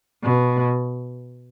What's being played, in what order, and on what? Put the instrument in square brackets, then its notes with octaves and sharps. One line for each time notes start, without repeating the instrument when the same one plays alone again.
[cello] B2